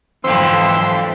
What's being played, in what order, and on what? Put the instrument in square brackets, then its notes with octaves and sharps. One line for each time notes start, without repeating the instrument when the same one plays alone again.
[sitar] F2 D3 [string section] G#2 E3 F#3 [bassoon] C4 [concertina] C6 E6